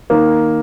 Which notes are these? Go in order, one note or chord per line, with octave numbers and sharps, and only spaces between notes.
D#3 A#3